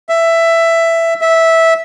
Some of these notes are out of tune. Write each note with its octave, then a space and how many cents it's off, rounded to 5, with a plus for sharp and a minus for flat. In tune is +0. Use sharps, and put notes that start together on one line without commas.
E5 +10
E5 -10